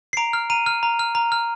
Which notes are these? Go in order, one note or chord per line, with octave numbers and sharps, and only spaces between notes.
C7
A#5 D7
F6
A#5 D#7
F6
A#5
F6
A#5
F6